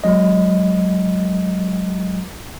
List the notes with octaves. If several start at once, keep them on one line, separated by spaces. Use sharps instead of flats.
F#3 G#3 D#5